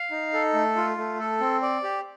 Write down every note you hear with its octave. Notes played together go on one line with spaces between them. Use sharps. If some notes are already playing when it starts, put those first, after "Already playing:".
Already playing: F5
D#4
A4
A3
F4
A3
A4
C4
D5
G4